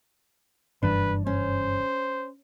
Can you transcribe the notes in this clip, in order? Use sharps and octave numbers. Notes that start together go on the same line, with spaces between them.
F#1 G2 E3 D4 B4
C#4 C5